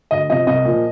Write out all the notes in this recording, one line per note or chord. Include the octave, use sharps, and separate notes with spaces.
D2 D#5
C3 F3 D#5
C2 D#5
A#2 F3